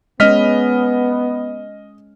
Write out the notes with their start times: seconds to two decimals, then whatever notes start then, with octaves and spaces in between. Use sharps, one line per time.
0.20 G#3 B3 C#4 D#5 F6 B6